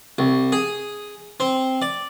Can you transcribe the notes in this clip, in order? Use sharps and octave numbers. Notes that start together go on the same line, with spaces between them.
C2
G#4
C4
D5